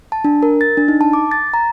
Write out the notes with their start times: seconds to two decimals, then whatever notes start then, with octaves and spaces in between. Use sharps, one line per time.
0.12 A5
0.24 D4
0.43 A#4
0.61 A6
0.77 D4
0.88 D#4
1.01 A5
1.13 D6
1.31 A6
1.54 A#5